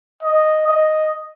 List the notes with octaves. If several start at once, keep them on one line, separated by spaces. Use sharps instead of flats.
D#5
D#5